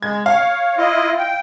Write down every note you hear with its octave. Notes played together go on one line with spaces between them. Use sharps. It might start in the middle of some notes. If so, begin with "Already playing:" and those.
G#3 G#6
C#5 F5
E4 F4 D#5
G5